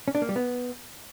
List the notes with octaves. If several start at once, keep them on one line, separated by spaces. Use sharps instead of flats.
C#4
D4
A#3
G3
B3